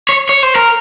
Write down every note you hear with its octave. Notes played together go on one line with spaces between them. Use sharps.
C#5
C#5
C5
A#4